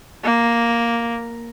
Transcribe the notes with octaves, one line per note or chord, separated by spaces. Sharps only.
A#3